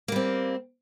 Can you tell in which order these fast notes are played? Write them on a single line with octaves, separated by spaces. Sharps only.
A#3 G3 C4